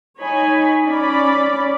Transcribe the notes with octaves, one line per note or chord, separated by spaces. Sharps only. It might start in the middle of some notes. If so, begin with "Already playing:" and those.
D#4 C#5 G#5 B5
C#4 D5 B5